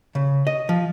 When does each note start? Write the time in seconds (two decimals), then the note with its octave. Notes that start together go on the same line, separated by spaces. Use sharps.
0.15 C#3
0.47 D#5
0.69 F3